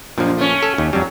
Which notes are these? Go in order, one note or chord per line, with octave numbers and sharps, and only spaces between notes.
F#2 A#2 F3
A3 C#4
A4
D#2
F2 F#3 G3